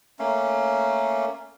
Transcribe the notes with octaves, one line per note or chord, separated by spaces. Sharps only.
A3 A#3 C#4